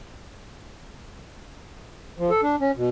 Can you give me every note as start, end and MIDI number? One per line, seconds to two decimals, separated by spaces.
2.18 2.30 53
2.30 2.41 69
2.43 2.56 62
2.61 2.71 61
2.76 2.89 47